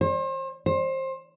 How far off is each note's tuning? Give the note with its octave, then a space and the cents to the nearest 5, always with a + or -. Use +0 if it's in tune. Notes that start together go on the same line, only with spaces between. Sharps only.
C5 +35
C5 +25